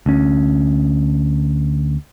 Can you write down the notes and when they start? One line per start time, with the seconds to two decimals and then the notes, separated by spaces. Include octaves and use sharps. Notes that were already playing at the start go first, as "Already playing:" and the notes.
0.06 D2 C#4